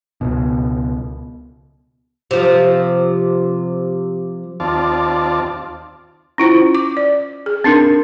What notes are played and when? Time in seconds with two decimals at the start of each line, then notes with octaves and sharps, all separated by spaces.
0.21 C#2 B2
2.31 C3 F3
4.60 D#2 C4 F4 D5 A5
6.38 C#4 E4 F4 C5
6.75 D6
6.97 D5
7.46 G#4
7.64 C4 D4 D#4 A#4